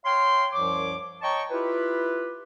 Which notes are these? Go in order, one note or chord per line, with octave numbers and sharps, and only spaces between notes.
C#5 F5 G5 C6
C2 F#2 F3 C#5 D6
C#5 D#5 G5 A5 A#5 C#6
E4 F4 G4 B4